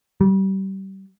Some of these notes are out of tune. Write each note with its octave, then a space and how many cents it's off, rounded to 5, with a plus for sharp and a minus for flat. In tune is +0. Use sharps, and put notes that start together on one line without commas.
G3 -25